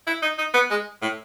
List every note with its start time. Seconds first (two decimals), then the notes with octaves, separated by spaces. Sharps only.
0.07 E4
0.23 D#4
0.39 D#4
0.54 B3
0.70 G#3
1.02 A2